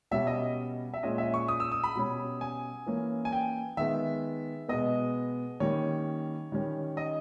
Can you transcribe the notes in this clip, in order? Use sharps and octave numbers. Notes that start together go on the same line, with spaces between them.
B2 G3 C#4 E5
D#5
E5
A#2 G#3 C#4 D#5
E5
C#6
D#6
E6
D#6
B5
B2 G3 C#4
G#5
E3 A#3 C#4
G#5
G5
D#3 G#3 B3 E5
B2 G#3 B3 D#5
D#3 G3 A#3 C#4 C#5
D#3 G3 C#4
D#5